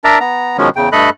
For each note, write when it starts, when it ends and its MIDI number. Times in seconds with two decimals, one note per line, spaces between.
0.04 0.19 62
0.04 0.19 70
0.04 0.19 74
0.04 0.19 76
0.04 0.19 82
0.20 0.57 59
0.20 0.57 82
0.58 0.69 47
0.58 0.69 51
0.58 0.69 53
0.58 0.69 56
0.58 0.69 61
0.76 0.89 40
0.76 0.89 49
0.76 0.89 79
0.92 1.10 43
0.92 1.10 57
0.92 1.10 69
0.92 1.10 75
0.92 1.10 83
0.92 1.10 90